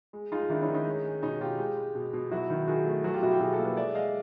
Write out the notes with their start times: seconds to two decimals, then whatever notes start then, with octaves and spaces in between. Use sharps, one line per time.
0.13 G#3
0.32 G#3 D#4 F4
0.50 D#3 D4 E4
0.62 C#4 D#4
0.68 D#3
0.74 C#4 D#4
0.86 G#3
1.05 G#3
1.22 B2 C#4 D#4
1.41 B2 F4 G4
1.58 G#3
1.77 G#3
1.95 B2
2.13 B2
2.31 F#3 E4 F#4
2.50 D#3
2.68 D#3 F#4 G#4
2.86 A3
3.04 F#3 F#4 G#4
3.14 F4 G4
3.22 B2 E4 F#4
3.32 F4 G4
3.40 B2 F#4 G#4
3.53 G4 A4
3.58 A#3
3.65 A4 B4
3.77 G#3 D5 E5
3.95 G#3 D#5 F5